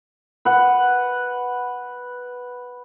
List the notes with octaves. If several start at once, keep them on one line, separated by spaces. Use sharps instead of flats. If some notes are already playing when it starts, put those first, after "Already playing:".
B4 F#5